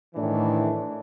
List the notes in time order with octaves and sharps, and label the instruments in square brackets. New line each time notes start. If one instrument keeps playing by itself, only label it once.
[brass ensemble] A2 D#3 E3 D4